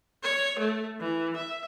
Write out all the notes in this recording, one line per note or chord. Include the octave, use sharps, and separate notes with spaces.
C#5
A3
E3
E5